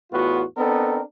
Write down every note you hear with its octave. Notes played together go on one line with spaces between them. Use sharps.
E2 A2 B3 F4 F#4
B3 C4 D4 D#4 A4 A#4